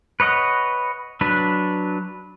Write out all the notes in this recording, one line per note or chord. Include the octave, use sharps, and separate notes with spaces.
B4 C#5 D#5 F#5
F#3 D4 B4